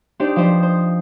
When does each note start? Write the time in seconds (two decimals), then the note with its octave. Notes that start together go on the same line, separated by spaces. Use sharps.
0.20 D4 D#4 G4 C5 D5
0.36 F3 B4 C5 D#5
0.63 C5